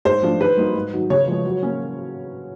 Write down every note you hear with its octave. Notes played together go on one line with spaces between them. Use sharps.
G#2 C5
F3 A3 D4 F4
D#3 B4
G3 A#3 D#4 F#4
G#2
D#3 F#3
C#3 C#5
F3 G#3
F#3
A#3 C#4